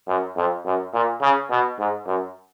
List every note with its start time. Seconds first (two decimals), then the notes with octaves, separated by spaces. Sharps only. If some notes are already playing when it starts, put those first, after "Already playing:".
0.08 F#2
0.37 F2
0.65 F#2
0.94 A#2
1.22 C#3
1.51 B2
1.79 G#2
2.07 F#2